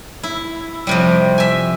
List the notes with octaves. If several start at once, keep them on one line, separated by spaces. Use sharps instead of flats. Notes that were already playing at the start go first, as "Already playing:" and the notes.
E4
F2 C3 G3
E5 G#5